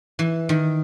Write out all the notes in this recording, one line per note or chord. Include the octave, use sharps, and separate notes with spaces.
E3
D#3